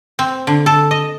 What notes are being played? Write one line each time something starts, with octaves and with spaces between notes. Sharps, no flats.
C4
D3
A4
D#5